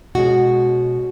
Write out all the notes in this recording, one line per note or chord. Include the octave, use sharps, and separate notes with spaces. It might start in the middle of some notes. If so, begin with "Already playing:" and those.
B2 G#3 C#4 F#4